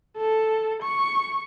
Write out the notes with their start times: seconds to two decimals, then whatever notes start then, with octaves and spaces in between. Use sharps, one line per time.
0.17 A4
0.83 C#6